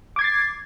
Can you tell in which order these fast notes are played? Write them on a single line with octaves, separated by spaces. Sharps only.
D6 G#6 C7 A6